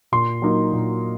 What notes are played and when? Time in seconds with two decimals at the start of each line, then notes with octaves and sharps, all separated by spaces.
0.12 A#2 C6
0.42 F#3 A#3 D#4
0.72 A#2